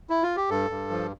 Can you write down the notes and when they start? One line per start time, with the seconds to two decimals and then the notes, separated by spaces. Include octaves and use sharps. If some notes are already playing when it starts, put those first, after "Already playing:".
0.10 E4
0.23 F4
0.36 G4
0.50 G2 A4
0.70 G2
0.90 F3